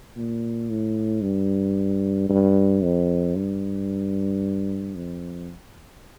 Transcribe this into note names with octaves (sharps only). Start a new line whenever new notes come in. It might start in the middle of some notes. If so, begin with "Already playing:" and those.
A#2
A2
G2
G2
F2
G2
F2